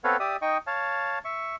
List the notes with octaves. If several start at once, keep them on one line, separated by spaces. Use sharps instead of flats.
B3 C4 A4 B4 C#5 F5
G4 D5 E5 D#6
D#4 D#5 G5 C#6
C#5 F5 A5
E5 C#6